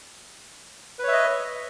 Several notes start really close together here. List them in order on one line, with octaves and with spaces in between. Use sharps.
B4 C#5 E5 D#5